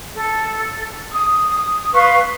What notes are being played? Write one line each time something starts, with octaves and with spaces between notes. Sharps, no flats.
A4
D#6
B4 F5 C6 C#6